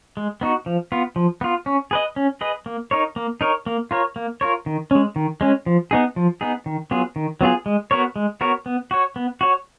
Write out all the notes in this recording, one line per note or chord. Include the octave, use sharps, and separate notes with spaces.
G#3
B3 D#4 F#4
F3
B3 F4
F3
B3 F4
C#4
G#4 B4 D#5
C#4
G#4 B4 D#5
A#3
D#4 A#4 C#5
A#3
D#4 A#4 C#5
A#3
F4 A#4 C#5
A#3
F4 A#4 C#5
D#3
G#3 C#4
D#3
G#3 C#4
F3
B3 D#4 G#4
F3
B3 D#4 G#4
D#3
F#3 B3 F4 G#4
D#3
F#3 B3 F4 G#4
G#3
B3 F#4 A#4 C#5
G#3
B3 F#4 A#4 C#5
B3
F#4 C#5
B3
F#4 C#5